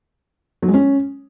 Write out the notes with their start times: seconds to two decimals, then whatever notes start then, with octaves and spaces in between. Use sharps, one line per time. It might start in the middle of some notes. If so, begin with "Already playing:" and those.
0.62 F#3
0.68 G#3
0.74 C#4